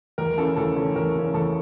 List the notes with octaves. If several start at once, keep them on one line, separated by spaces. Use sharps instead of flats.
E2 A#4
C#3 E3 A3 C#4 A4
E2 A4
C#3 E3 A3 C#4
E2 A#4
C#3 E3 A3 C#4
E2 A4